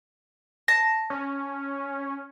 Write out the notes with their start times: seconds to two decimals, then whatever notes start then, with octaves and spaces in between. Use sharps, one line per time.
0.68 A5 A#6
1.10 C#4